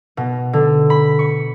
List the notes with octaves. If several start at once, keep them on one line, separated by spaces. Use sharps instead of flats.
B2
D3
B5
C#6